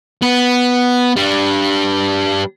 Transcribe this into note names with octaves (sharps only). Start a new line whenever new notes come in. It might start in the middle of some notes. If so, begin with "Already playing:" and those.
B3
G3 D4